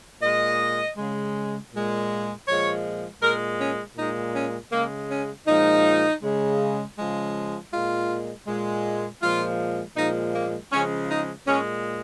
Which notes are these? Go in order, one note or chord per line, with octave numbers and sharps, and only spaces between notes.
A#2 G#3 D#5
C#3 G#3
A#2 G#3
A#2 F3 G#3 C#5
A#2 G#3 A#4
C#4
A#2 G#3 D#4
C#4
C#3 G#3 A#3
C#4
A#2 F3 G#3 D#4
C#3 G#3
C#3 F3 G#3
A#2 G#3 F4
A#2 G#3
A#2 F3 G#3 F4
A#2 F3 G#3 D#4
A#3
C#3 F3 G#3 C#4
D#4
A#2 G#3 C#4